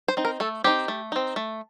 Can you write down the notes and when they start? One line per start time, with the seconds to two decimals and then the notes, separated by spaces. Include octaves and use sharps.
0.08 C5
0.17 C4 D#4
0.25 A#4
0.40 A3 A4
0.64 C4 D#4 G4
0.88 A3
1.12 C4 D#4
1.36 A3